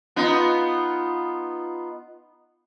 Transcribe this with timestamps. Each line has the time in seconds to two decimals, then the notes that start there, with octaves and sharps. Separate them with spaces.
0.16 B3 D#4 F4